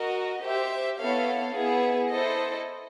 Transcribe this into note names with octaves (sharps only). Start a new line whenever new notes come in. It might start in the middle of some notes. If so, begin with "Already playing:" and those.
Already playing: F#4 A#4 D#5
G4 C5 E5
B3 E4 A4 C#5 F5
B3 E4 G#4
E4 A4 C5 D#5